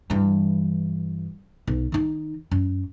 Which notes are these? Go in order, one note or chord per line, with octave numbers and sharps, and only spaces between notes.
G2 E3
B1
D#3 D#4
F#2